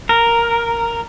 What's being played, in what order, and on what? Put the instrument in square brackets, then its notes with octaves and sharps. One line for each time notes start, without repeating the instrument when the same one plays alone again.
[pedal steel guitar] A#4